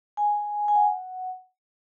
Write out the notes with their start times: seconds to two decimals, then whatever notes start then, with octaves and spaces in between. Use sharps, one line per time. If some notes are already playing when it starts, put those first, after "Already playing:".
0.17 G#5
0.68 G#5
0.75 F#5